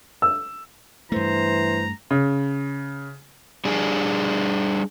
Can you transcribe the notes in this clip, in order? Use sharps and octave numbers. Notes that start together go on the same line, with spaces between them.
E6
G2 E3 A3 C5 A#5
C#3
G3 D4 G#4